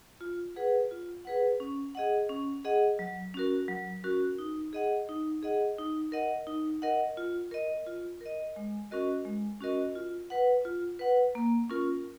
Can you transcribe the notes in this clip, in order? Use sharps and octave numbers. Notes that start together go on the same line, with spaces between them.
F4
G#4 B4 F#5
F4
G#4 B4 F#5
C#4
G#4 D#5 F#5
C#4
G#4 D#5 F#5
F#3
C#4 F#4 A#4
F#3
C#4 F#4 A#4
D#4
G#4 D#5 F#5
D#4
G#4 D#5 F#5
D#4
A#4 D#5 F#5
D#4
A#4 D#5 F#5
F4
A#4 D#5
F4
A#4 D#5
G#3
C#4 F#4 A#4 D#5
G#3
C#4 F#4 A#4 D#5
F4
B4 F#5
F4
B4 F#5
A#3
C#4 F4 A#4